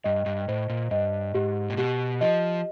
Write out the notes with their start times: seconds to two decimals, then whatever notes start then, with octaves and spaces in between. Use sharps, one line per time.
0.04 G2 D#5
0.26 G2
0.48 A2 C5
0.69 A#2
0.91 G2 D#5
1.35 G#2 G4
1.70 A#2
1.77 B2 G4
2.21 F3 D#5